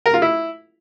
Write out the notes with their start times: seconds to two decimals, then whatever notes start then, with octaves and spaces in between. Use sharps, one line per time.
0.06 A#4
0.14 F4
0.22 E4